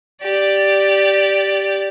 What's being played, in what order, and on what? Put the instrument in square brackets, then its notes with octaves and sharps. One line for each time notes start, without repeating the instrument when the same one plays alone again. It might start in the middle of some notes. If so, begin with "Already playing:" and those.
[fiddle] G4 D5